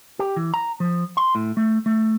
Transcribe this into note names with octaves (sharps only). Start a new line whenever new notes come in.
G4
E3
A#5
F3
C6
A2
A3
A3